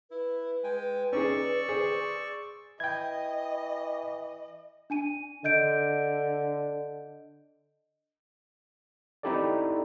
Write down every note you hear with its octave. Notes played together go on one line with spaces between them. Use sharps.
E4 B4
G#3 G5 G#5
C#4 D#4 G#4 D5 C#6 E6
G#4 C5
E3 D#5 G5 G#6
D4 G#5 D#7
D3 D#5 G6 D7
C4 D#4 E4 G4 A4 D5